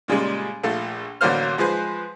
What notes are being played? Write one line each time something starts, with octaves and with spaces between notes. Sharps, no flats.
A#2 C#3 G3 G#3
A#1 A3 F4 A4
A1 D3 F#3 A#3 C5 F6
F3 G#3 G#4 B4 C5